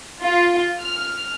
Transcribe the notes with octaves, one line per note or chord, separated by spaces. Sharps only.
F4
F6